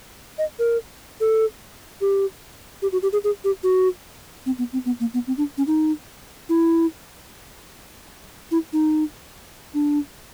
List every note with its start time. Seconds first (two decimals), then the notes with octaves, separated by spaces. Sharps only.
0.38 D#5
0.59 A#4
1.21 A4
2.01 G4
2.82 G4
2.92 F#4
3.03 G4
3.13 G#4
3.24 G#4
3.44 G4
3.64 F#4
4.46 C4
4.58 B3
4.73 C4
4.85 B3
5.00 A#3
5.14 B3
5.27 C4
5.38 D4
5.58 C#4
5.67 D#4
6.49 E4
8.51 E4
8.73 D#4
9.74 D4